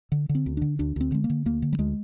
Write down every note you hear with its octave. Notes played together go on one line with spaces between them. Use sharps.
D3
D3
C4
D2
D3 D4
D2 D4
D2 C4
D3 G#3
A#3
D3
D2 A#3
D3
G3
D2 G#3